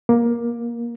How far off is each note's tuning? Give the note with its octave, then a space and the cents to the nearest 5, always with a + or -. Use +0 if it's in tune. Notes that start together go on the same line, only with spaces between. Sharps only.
A#3 +15